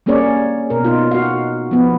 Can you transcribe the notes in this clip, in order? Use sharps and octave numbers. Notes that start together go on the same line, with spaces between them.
G3 A#3 C#4 G#4 C#5 D5
B2 A#4
D#4 F4
F#4 F5
F3 B3